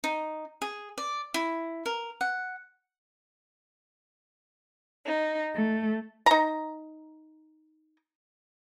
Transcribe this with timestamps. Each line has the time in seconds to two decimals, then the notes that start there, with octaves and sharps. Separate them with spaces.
0.04 D#4
0.62 G#4
0.98 D5
1.34 E4
1.86 A#4
2.21 F#5
5.05 D#4
5.53 A3
6.26 D#4 A#5